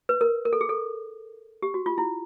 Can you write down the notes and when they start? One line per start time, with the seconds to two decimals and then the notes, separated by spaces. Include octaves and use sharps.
0.09 B4
0.21 A#4
0.45 A#4
0.53 A4
0.61 G#4
0.69 A4
1.63 G4
1.74 F#4
1.86 F4
1.98 E4